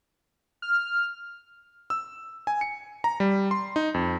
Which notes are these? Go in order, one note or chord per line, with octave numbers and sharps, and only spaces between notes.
F6
E6
G#5
C#7
A#5
G3
C6
D#4
F2